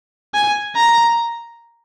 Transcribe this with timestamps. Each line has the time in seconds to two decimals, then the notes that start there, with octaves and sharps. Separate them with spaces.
0.34 G#5
0.76 A#5